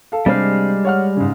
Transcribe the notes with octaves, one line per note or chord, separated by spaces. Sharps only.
A4 F5
C3 G3 G#3 D4 C5 F5
C#5 F#5 F6
G#2 C#3